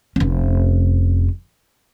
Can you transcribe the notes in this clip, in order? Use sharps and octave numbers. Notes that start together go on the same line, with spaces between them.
F1 C#4